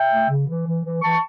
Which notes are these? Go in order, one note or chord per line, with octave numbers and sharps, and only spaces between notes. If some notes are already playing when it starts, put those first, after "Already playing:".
Already playing: E5 G5
A3
C#3
E3
E3
E3
E3 A5 C#6